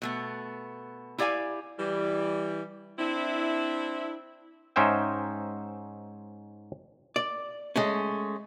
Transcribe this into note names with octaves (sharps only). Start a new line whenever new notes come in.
B2 A3 B3
E4 G4 D5 F5 G#5
E3 G3
C4 D4 E4
G#2 C#4 D#4 C5 E5 G5
D5
G#3 A3 C#4